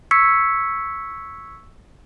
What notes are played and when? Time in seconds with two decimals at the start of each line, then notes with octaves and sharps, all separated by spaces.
0.11 C#6 E6 G#6 B6 C#7